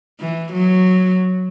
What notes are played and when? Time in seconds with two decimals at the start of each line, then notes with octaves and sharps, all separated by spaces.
0.20 E3
0.53 F#3